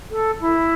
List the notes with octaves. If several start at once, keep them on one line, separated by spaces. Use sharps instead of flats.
A4
E4